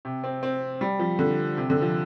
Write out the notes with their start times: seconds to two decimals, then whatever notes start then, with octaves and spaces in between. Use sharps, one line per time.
0.05 C3
0.24 C4
0.43 C4
0.81 G3
0.99 F3
1.19 D3
1.57 C3
1.70 D3
1.82 F3